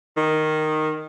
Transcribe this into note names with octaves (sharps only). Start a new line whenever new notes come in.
D#3